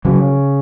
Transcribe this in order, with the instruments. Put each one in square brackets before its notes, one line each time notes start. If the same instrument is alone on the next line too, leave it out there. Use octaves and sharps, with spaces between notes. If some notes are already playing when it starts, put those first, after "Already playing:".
[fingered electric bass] C#3 F#3